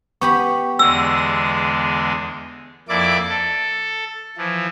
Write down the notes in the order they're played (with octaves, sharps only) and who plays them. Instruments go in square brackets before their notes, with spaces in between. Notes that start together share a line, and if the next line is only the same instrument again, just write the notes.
[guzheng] B3 G4 B5 [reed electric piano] C#6
[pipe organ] E2 D3 G#3 [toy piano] E6
[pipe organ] F2 A#3 E4 D5 D6
A4
E3 F3